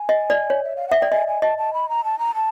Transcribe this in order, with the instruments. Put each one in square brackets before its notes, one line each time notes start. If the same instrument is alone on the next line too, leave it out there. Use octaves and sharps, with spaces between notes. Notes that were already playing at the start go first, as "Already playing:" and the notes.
Already playing: [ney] G#5
[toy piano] D#5
D5
C#5
[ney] E5
F5
[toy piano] E5 [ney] F#5
[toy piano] D5 [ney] G5
[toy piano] D#5 [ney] G#5
[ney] G#5
[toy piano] D#5 [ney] A5
[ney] A5
B5
A#5
A5
A#5
A5